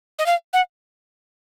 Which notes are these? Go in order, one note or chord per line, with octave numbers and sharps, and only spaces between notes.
D#5
F5
F#5